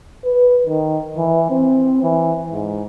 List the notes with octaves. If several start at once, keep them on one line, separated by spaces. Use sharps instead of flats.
B4
D#3
E3
C4
E3
G#2